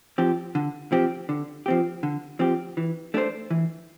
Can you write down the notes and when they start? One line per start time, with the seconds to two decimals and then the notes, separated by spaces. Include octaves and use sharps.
0.18 F3 C4 G4
0.55 D3
0.92 F3 C4 G4
1.29 D3
1.66 F3 C4 G4
2.03 D3
2.39 F3 C4 G4
2.77 E3
3.14 A3 D4 A4 C5
3.51 E3